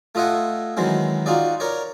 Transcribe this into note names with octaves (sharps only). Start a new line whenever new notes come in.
A3 F4 D#5 E5 F#5 G#5
D#3 E3 F#3 G#3 C4
D#4 F4 F#4 G#4 D5
A#4 C#5 D5